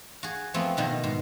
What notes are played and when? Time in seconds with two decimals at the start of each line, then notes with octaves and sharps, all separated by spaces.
0.23 F#4 G#4
0.54 F3 A3 B3 C4
0.77 B2 D#3 B3
1.04 G#2